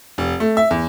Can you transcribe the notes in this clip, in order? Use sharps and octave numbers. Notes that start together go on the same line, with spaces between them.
F1
A3
E5
E2